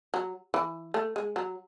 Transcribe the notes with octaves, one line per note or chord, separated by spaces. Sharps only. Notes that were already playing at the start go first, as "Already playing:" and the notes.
F#3
E3
A3
G#3
F#3